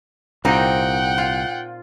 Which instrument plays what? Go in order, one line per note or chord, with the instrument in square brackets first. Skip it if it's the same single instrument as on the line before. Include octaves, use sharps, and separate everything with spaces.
[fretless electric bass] C2 [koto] A#2 C4 D#4 [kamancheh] F#5 G5
[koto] F4